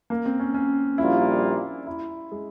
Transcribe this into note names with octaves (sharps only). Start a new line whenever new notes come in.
A#3
C4
C#4
C#4
A#1 A#2 G3 A#3 E4 F4
E4
G#3